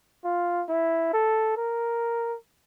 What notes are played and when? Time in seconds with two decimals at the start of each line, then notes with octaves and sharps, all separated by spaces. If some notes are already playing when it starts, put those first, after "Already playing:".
0.24 F4
0.69 E4
1.13 A4
1.57 A#4